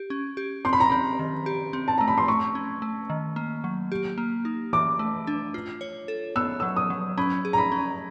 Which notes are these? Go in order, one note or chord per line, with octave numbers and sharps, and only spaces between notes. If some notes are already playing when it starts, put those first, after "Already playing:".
Already playing: G4
C#4
G4
C4 C6
B5
A#5
C4 B5
D#3
G4
C4
A5
A3 A#5
B5
C6
A3 C#6
C#4
A3
D#3
A#3
F#3
G4
A#3
D#4
E3 D6
A3
D4
F4
C#5
A4
B3 E6
F#3 E6
D#6
F#3
C#4 B5
G#4
A#5
B5
C#4